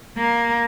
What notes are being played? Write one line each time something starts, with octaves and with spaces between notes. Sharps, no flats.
A#3